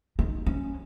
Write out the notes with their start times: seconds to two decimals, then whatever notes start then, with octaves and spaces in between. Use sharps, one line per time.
0.19 D#4
0.46 C#4